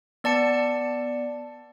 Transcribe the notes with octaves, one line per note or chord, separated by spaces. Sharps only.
B3 D5 A5 C#7